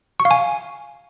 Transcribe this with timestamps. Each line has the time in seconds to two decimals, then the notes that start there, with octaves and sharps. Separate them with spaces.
0.20 C#6
0.25 F5
0.31 G#5